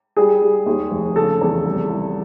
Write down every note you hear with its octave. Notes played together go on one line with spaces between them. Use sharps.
G3 G#4
G3
D#2
F1
C#3 A4
E2
C2
C2